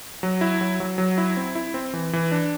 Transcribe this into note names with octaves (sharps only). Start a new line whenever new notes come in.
F#3
E4
F#3
F#3
F#3
E4
C4
E4
C4
E3
E3
D4